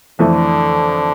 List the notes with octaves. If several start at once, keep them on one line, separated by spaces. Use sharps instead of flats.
F2 D3 E3 A3 E4